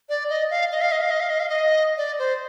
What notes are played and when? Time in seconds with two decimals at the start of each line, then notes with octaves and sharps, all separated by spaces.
0.09 D5
0.30 D#5
0.51 F5
0.72 D#5
0.81 F5
0.92 D#5
1.01 F5
1.10 D#5
1.20 F5
1.30 D#5
1.40 F5
1.49 D#5
1.97 D5
2.19 C5